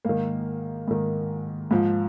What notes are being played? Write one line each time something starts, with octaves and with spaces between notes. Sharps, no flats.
G#2 D#3 A#3
G#2 D#3
G#2 F3